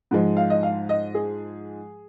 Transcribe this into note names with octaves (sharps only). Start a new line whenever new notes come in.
G#2 F3 G#3
F5
D#5
F5
D#5
G#4